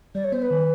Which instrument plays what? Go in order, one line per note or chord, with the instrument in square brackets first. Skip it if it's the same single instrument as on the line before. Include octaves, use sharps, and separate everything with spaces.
[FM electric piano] G3 [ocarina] D5
[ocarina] C#5
[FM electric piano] B3 [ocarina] C5
[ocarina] B4
[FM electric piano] D#3